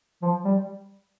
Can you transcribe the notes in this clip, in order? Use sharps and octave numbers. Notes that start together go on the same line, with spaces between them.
F3
G3